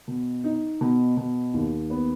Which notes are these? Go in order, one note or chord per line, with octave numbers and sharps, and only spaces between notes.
B2
D#4
B2
B2
D#2
B3